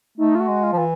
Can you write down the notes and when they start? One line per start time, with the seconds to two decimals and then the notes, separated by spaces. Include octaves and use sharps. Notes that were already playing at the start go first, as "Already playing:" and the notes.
0.18 A3 D#4
0.35 F4
0.40 F#4
0.48 G#3
0.63 F4
0.72 F3
0.78 E3